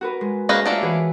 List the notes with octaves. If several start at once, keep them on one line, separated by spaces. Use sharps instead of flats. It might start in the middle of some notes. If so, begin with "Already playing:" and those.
F#4 A#4 B4
G#3
G#3 A#3 C#4 G#4 B4 A#6
A3 A#3 D4 F4 F#4 E5
E3 F#4 G#4 B4